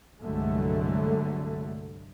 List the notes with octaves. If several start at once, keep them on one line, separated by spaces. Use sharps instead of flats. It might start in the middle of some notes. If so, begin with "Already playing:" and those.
C2 G2 D3 F#3 G#3 A3